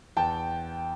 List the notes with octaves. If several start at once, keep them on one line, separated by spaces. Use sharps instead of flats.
E2 G5 A5